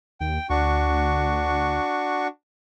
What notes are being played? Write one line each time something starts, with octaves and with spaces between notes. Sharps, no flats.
D#2 G5
D2 D4 F#4 C#6